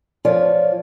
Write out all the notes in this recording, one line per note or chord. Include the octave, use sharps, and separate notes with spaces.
F3 F4 C#5 D5